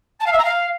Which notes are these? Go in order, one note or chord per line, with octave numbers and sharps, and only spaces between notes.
A5
F5
E5
A#5
F5